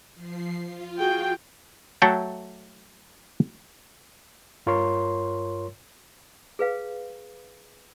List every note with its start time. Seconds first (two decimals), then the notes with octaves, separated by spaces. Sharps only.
0.15 F3 C7
0.64 F4
0.99 F#4 G#4 G5
2.02 F#3 A3 A4 E5 F#5 G5
4.66 G2 F4 A#4 C#5 C6
6.59 G#4 B4 F5